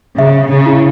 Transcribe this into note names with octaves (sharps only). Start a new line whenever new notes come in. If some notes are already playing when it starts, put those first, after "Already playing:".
C#3 E5
C#3
E4